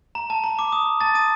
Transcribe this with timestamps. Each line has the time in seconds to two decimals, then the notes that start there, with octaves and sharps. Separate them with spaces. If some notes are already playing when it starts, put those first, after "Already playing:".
0.15 A#5
0.30 A5
0.44 A#5
0.59 D6
0.72 D#6
1.01 A5 A6
1.15 D#6 D#7